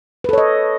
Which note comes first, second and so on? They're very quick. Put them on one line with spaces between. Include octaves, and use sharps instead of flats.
B4 A4 C#5 D#5